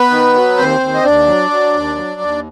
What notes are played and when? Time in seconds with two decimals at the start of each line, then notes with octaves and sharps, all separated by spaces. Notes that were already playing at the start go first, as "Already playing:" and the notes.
Already playing: B3 B4
0.10 D#3
0.34 F#3
0.57 D#2 C4 C5
0.81 D#2
0.94 D#5
1.04 D#2 D4 D5
1.27 F#3
1.51 F#3
1.74 D#2
1.97 F#3
2.21 D#2